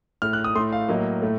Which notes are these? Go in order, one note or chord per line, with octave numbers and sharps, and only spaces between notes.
A2 A3 F6
F#6
D#6
A2 A3 C6
F5
A2 F#3 A#3 D#5
A2 A3